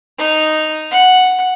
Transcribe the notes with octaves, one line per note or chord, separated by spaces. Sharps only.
D#4
F#5